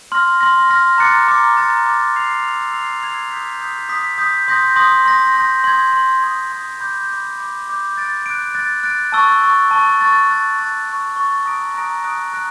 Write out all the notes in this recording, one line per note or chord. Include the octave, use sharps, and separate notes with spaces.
C6 F6 A#6
C6 F6 A#6
C6 F6 A#6
A#5 D6 F#6 A6 C#7
A#5 D6 F#6 A6 C#7
A#5 D6 F#6 A6 C#7
A#5 D6 F#6 A6 C#7
E6 G#6 C7 F7
E6 G#6 C7 F7
E6 G#6 C7 F7
E6 G#6 C7 F7
D#6 G6 B6
D#6 G6 B6
D#6 G6 B6
D#6 G6 B6
C6 D#6 G6 A#6
C6 D#6 G6 A#6
C6 D#6 G6 A#6
C6 D#6 G6 A#6
C6 D#6 G#6
C6 D#6 G#6
C6 D#6 G#6
C6 D#6 G#6
B5 D6 G6
B5 D6 G6
B5 D6 G6
B5 D6 G6
F#6 A6 D7
F#6 A6 D7
F#6 A6 D7
F#6 A6 D7
A5 C#6 E6 A6
A5 C#6 E6 A6
A5 C#6 E6 A6
A5 C#6 E6 A6
C#6 F#6 A6
C#6 F#6 A6
C#6 F#6 A6
C#6 F#6 A6
A#5 D#6 F#6 A#6 D7
A#5 D#6 F#6 A#6 D7
A#5 D#6 F#6 A#6 D7
A#5 D#6 F#6 A#6 D7